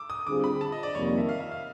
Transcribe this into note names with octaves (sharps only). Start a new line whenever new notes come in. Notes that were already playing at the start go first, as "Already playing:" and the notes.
Already playing: D6 E6
D#6
D3 G3 C4 F4 G#4 D6
B5
A5
D#5
D5
F2 C3 D#3 G3 A#3 C#5
D#5
E5
F5
E5
F5